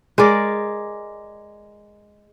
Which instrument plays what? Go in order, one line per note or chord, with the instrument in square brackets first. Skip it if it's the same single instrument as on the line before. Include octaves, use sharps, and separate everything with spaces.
[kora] G#3 A#4 D5